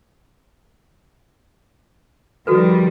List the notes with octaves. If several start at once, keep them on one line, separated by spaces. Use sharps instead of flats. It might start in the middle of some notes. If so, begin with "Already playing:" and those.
D#3 F3 G3 F#4 A4 B4